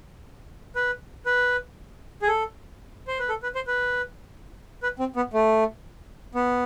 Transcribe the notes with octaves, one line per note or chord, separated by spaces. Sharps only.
B4
B4
G#4
A4
C5
B4
A4
B4
C5
B4
B4
C4
B3
A3
B3